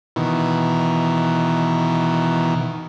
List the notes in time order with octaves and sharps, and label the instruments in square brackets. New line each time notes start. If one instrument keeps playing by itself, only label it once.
[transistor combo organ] B2 D#3 E3